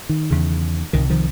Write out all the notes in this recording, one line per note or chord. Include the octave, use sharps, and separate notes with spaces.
D#3
E2 C#3
C2 C3 D#3
D#3 F3